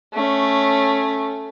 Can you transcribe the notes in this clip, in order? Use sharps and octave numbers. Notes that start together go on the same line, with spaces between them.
A3 C#4